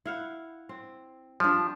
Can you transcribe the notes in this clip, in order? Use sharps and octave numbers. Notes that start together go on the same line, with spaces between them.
E4 F5 F#5
C4
F3 G3 D4